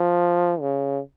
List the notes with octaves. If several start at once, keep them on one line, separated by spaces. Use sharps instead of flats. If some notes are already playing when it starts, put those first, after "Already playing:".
Already playing: F3
C#3